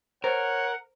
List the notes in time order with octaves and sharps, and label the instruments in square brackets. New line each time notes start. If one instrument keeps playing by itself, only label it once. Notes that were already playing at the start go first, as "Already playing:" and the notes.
[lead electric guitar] A#4 [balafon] C5 [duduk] C#5 [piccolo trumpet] F#5